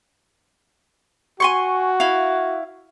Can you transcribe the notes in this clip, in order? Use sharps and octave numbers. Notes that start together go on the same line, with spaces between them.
F#4 G#5 C6 C#6
E4 F5